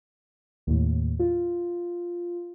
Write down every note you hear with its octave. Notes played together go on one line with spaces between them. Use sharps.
D#2 A2
F4